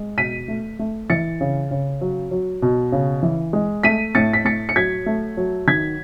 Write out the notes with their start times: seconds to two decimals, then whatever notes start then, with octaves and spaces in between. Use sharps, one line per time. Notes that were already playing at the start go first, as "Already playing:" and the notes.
Already playing: G#3
0.17 B2 B6 D#7
0.48 A3
0.79 A3
1.10 E3 A6 C#7
1.41 C#3
1.71 C#3
2.01 F#3
2.31 F#3
2.62 B2
2.92 C#3
3.23 E3
3.53 G#3
3.83 A3 B6 D#7
4.15 A2 A6 C#7
4.33 B6
4.45 A2 A6 C#7
4.69 C#7
4.76 F#3 G#6 B6
5.06 A3
5.37 F#3
5.67 D#3 G#6 B6